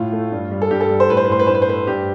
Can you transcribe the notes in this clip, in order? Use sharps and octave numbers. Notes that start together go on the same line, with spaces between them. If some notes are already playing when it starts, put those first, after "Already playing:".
Already playing: A2 F4
A3
G2
G3
A4
G2 G4
A4
G3
C5
A2 B4
C5
B4
A2 C5
B4
G2 C5
B4
C5
A3 B4
G2 G4